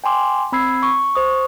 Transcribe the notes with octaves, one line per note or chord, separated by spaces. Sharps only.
G5 G#5 C6 D6
C4 B5 E6 G#6 C7
C#6
C5 C#6 D#6